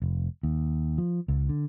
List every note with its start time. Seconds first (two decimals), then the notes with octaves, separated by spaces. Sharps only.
0.02 F1
0.43 D#2
0.98 F3
1.28 C#2
1.49 D3